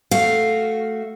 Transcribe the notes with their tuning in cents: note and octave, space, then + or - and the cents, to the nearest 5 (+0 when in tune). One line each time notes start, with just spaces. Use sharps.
A3 +0 F#4 +0 F5 +0